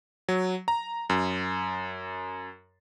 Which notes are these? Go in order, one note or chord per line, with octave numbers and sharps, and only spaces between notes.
F#3
A#5
F#2